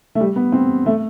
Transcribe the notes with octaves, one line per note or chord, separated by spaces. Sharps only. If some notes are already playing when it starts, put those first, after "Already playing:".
A3
G3
B3
C4
A3